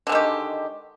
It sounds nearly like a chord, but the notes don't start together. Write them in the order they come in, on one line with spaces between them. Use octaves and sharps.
D3 G#3 D#3 G4